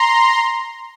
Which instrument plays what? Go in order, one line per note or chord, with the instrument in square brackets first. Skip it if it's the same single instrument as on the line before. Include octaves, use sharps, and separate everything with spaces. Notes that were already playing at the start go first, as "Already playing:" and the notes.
Already playing: [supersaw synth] A#5 C6